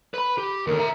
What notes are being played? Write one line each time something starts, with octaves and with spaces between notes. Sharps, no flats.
B4 B5
G4
D#2 D3 A#4
E5 A#5